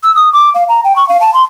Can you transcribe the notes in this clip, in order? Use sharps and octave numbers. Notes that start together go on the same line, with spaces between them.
E6
D#6
D6
F5
A#5
G5
C#6
F5
A5
C6